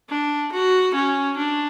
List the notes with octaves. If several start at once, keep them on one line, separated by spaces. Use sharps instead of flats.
D4
F#4
C#4
D4